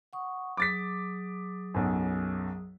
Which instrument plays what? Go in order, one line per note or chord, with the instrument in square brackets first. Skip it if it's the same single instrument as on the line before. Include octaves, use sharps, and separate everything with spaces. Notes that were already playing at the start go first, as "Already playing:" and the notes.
[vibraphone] F#5 C#6 D#6
[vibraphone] F#3 G#4 D#6 [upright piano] D6 A6 B6
[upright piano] B1 F#2